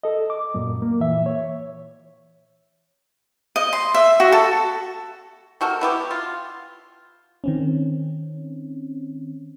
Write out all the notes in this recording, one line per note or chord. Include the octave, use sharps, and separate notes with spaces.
A4 D#5
D6
F#2 A#2
A#3
A#2 E3 E5
C#5
D#5
C6
E5
F#4
A4
C3 F#4 A4 A#4
B3 E4 G4
F4
D#3 C4 C#4